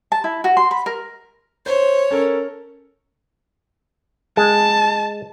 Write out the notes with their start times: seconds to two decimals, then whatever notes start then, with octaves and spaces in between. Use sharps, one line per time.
0.12 A5
0.24 E4
0.44 F#4
0.57 C6
0.71 B5
0.86 A#4
1.66 C5 C#5
2.11 C#4 A4 A#4
4.37 G#3 A5